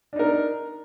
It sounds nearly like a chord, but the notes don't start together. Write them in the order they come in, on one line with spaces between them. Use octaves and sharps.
D4 D#4 A#4